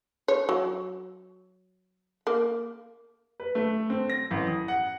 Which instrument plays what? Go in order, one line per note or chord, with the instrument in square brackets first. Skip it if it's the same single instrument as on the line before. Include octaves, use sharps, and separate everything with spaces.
[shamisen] C#5
F#3
A#3
[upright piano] B4
A3
C4
A#6
A1
D#6
F#5